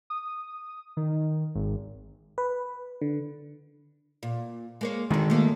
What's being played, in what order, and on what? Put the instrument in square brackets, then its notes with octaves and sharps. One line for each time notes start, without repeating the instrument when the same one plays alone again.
[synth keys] D#6
D#3
G#1
[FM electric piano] B4
D3
[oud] A#2
G#3 A#3 C#5
[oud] G2 D3 [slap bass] D#3 G#3
[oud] A3 A#3